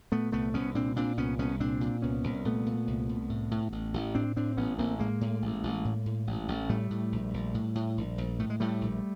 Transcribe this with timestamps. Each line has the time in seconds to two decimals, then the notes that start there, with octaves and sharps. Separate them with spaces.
0.12 A#2 A3 B3
0.32 C2 A3 B3
0.54 C2 B3 C#4
0.75 A#2 C4 D4
0.96 A#2 C4 D4
1.18 C2 B3 C#4
1.39 C2 B3 C#4
1.60 A#2 C4 D4
1.81 A#2
2.02 C2 B3 C#4
2.24 C2
2.45 A#2 A3 B3
2.66 A#2
2.87 C2
3.09 C2
3.29 A2
3.51 A2
3.72 A1
3.94 A1
4.15 A2 C4 D4
4.36 A2 C4 D4
4.57 A1 B3 C#4
4.78 A1 A#3 C4
4.99 A2 G#3 A#3
5.21 A2
5.42 A1
5.63 A1
5.85 A2
6.06 A2
6.27 A1
6.48 A1
6.69 A2 G3 A3
6.91 A2
7.12 A#1
7.34 A#1
7.54 A2
7.75 A2
7.97 A#1
8.18 A#1
8.39 A2 A3
8.50 G#3
8.60 A2 G3 A3
8.81 A#1